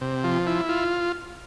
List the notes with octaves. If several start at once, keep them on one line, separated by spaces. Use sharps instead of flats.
C3
F3
E4
F4